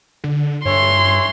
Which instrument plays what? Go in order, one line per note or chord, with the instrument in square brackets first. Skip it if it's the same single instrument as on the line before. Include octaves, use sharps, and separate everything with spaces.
[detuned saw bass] D3
[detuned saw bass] G2 [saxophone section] E3 A4 C#5 [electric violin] C6